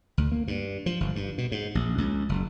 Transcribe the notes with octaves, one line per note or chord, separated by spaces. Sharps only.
D2
A#3
G2
F3
G1
G2
B2
G#2
A#1
C#2
F#1